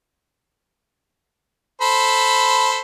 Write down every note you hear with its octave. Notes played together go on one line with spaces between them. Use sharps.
A4 C5 B5